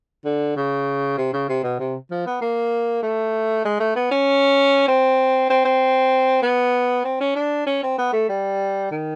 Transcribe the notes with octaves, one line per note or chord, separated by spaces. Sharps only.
D3
C#3
C3
C#3
C3
B2
C3
F3
B3
A#3
A3
G#3
A3
B3
C#4
C4
C4
C4
B3
C4
C#4
D4
C#4
C4
B3
A3
G3
D#3